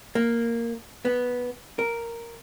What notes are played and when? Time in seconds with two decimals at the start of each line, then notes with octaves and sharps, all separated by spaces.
0.15 A#3
1.05 B3
1.79 A#4